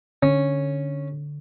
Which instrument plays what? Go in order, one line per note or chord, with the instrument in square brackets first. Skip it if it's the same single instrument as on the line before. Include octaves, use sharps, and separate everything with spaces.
[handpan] D3 [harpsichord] C#4